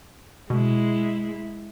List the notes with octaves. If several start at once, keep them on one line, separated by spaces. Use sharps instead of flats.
B2 G#3 E4